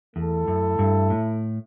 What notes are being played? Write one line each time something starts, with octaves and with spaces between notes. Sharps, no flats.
E2 A3 E4 A4
F#2
G2
A2